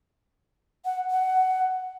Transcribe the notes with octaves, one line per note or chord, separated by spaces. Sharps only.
F#5
F#5